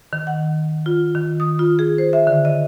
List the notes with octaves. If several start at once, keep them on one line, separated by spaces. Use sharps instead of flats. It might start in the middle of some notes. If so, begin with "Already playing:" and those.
D#3
F#5
F4
D#3
D#6
F4
G#4
C5
E5
D3
D#5